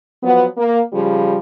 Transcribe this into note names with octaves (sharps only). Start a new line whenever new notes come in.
F3 F#3 B3
A#3
C#3 F3 G3